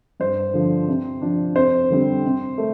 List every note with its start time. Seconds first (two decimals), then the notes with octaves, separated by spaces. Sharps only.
0.20 G2 C5
0.54 D3 F3
0.88 C3
1.22 F3 D4
1.56 F2 C5
1.90 D3 G3 C4
2.25 C3
2.58 A3